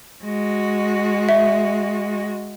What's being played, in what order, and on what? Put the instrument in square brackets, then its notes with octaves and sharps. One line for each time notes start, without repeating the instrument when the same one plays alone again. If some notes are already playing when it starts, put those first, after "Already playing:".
[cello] G#3 F#4
[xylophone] E5